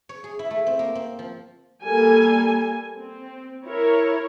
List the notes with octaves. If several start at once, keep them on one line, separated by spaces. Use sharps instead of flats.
C#5
G#4
E4
A3
C4
A#3
C4
F3
G3 A#3 A4 G#5
C4
E4 A#4 C#5